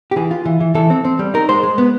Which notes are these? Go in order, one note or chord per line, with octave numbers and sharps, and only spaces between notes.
G4
E3 G#4
F4
E3
E3
E3 A4
C4
C4
G3
D#4 A#4
G#3 C5
G#3
B3